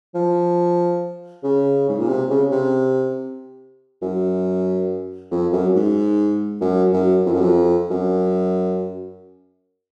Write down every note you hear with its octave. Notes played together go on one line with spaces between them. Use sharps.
F3
C#3
G#2
A#2
C3
C#3
C3
F#2
F2
F#2
G#2
F#2
F#2
F2
F#2
F2
F#2